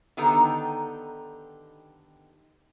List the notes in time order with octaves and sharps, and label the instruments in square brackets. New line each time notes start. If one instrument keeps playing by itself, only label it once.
[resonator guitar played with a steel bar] D3 D#3 B3 D#4 G4 A4